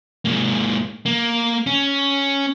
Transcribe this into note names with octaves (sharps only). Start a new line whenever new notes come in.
G#2 A#3
A#3
C#4